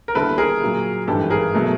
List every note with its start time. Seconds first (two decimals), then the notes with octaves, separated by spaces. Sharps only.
0.08 A#4
0.14 D#2 D3 G3 B3 E4 A4 B4
0.38 G#4 A#4
0.62 A#2 F#3 A#3
1.07 G#1 G2 E3 G4 A4
1.30 G#4 A#4
1.55 B2 F#3 A3